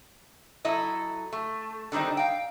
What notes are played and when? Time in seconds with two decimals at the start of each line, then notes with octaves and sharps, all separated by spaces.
0.65 F#3 E4 A4 D#5
1.33 A3
1.92 D3 D#3 G3 C4 D#4
2.17 F5 G5